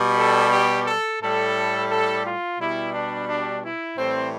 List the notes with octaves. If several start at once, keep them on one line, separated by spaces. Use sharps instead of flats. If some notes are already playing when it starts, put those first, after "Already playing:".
Already playing: B2 G3
A4
G4
A4
A2 G3 A4
A4
F4
B2 G3 E4
D4
D4
E4
A2 E3 G3 C4